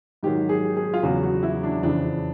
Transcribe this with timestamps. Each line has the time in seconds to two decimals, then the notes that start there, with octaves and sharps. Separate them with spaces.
0.23 G#2 D#3 F#3 G4
0.49 G#4
0.77 G#4
0.94 F4
1.03 E2 C#3 F#3 F#4
1.23 F#4
1.43 E4
1.63 D4
1.82 F2 C#3 E3 D4